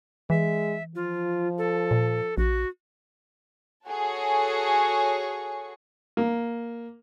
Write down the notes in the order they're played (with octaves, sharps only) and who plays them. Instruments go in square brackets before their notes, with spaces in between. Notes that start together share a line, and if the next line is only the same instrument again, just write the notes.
[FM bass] E3 [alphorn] G#3 [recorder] E5
[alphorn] F3 [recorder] F4
[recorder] A4
[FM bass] A#2
[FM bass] A#1 [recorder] F#4
[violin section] F#4 G#4 A4 C#5 C#6
[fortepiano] A#3